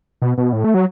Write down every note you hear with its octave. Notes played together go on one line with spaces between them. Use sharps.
B2
B2
A2
A3
F#3